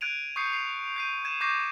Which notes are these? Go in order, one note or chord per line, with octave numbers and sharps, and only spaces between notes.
F#6 G#6 D7 D#7 F7
C#6 D#6 G6 C7 C#7
C7 F7
G6 C7 D#7
G#6 D#7 E7
C#6 D6 G6 G#6 A#6 C7